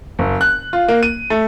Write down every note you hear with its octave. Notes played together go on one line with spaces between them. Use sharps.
F#1
F#6
F4
A#3
D#7
A3